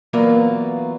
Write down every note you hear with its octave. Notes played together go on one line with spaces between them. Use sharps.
E3 F#3 A#3 B3 F4 D5